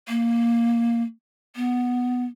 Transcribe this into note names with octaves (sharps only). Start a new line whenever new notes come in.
A#3
B3